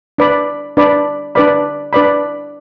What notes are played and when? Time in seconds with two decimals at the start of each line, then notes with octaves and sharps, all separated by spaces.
0.18 D4 B4 D5 B5
0.77 D4 B4 D5 B5
1.35 D4 B4 D5 B5
1.93 D4 B4 D5 B5